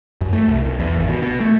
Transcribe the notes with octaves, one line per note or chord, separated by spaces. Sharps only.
F#2
A3
C2
B1
E2
G#1
B2
B2
A3